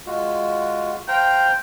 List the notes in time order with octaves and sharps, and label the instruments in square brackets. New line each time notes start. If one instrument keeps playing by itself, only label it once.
[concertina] G#3 F4 F#4
[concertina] C5 F5 A#5 [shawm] G5